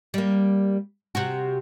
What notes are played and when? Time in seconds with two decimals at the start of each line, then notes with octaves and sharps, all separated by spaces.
0.14 G3 A#3
1.15 C3 F#4